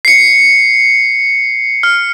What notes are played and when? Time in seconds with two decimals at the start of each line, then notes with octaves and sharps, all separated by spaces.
0.05 C7 C#7
1.83 F6